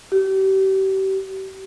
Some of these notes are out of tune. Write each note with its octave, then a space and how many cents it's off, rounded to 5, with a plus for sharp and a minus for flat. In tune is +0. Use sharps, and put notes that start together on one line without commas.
G4 -35